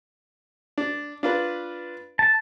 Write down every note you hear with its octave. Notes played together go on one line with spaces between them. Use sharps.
D4
D4 F4 B4
A5